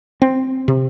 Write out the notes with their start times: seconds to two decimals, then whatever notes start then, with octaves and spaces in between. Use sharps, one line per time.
0.22 C4
0.68 C3